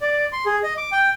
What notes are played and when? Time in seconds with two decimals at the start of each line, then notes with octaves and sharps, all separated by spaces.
0.01 D5
0.33 C6
0.46 G#4
0.63 D#5
0.77 D6
0.92 G5